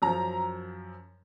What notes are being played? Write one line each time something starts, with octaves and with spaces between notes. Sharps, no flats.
F#2 F3 A#5